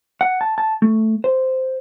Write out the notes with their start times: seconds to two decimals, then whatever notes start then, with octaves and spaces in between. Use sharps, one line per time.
0.21 F#5
0.41 A5
0.58 A5
0.82 A3
1.24 C5